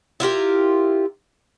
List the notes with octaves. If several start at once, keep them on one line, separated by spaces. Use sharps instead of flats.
E4 F4 G4 A#4